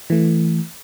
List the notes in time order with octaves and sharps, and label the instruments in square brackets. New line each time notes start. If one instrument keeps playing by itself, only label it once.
[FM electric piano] E3 A3